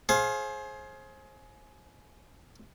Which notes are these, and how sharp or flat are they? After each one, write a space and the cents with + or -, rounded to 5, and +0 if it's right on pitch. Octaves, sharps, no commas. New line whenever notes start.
G#4 +25 C5 +35 F5 +0